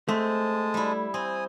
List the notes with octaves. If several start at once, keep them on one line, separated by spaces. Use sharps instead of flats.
G#3 A3 C4 A5 D#6
G3 E4
C4 G#5 D#6